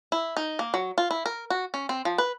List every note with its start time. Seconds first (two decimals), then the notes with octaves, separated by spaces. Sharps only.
0.12 E4
0.37 D#4
0.59 A#3
0.74 F#3
0.98 F4
1.11 E4
1.26 A#4
1.50 F#4
1.74 C#4
1.89 C4
2.05 F3
2.18 B4